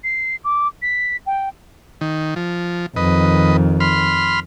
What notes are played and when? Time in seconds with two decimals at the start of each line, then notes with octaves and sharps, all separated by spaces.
0.04 C7
0.44 D6
0.82 B6
1.26 G5
2.01 D#3
2.36 F3
2.96 F2 D#3 B4 D#5
3.80 B5 C6 F6